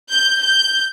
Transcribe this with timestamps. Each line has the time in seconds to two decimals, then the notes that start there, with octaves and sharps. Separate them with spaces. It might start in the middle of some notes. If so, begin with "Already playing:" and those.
0.13 G6
0.42 G6